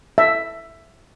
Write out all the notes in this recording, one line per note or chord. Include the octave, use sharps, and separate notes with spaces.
E5